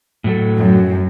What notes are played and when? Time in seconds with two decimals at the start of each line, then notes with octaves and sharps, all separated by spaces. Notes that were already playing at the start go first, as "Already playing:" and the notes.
0.24 A2 F#3 A4
0.59 F#2